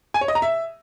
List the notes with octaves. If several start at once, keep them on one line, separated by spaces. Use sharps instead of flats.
G#5
C#5
D#5
A#5
E5